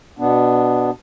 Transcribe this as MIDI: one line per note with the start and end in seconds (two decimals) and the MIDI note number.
0.19 0.91 47
0.19 0.91 59
0.19 0.91 62